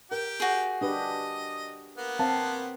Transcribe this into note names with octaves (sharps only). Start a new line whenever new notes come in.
G4 A#4
F#4 G#4
D4 G4 B4 D#5
A#3 B3
C4 B4 F5 A5